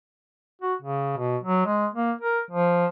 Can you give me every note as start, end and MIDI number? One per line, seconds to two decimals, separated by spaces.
0.61 0.74 66
0.82 1.13 49
1.17 1.37 47
1.43 1.64 54
1.66 1.87 56
1.93 2.13 58
2.21 2.41 70
2.51 2.86 53